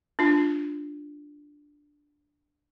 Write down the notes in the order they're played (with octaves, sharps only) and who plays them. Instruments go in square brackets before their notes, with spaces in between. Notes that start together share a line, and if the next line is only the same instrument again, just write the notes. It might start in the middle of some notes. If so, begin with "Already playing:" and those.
[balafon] D4 F4